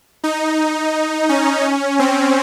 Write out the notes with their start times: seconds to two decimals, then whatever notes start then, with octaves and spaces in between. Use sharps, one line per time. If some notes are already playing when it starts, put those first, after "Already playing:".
0.24 D#4
1.29 C#4
1.99 C4